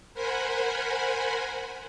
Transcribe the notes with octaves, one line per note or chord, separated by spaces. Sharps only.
A#4 C5 F#5 G#5 B5